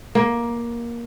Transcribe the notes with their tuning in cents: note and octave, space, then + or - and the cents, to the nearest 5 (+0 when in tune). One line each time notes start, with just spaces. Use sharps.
A#3 +15